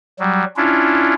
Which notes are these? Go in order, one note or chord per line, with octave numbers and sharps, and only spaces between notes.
F#3 G3
C#4 D4 E4 F4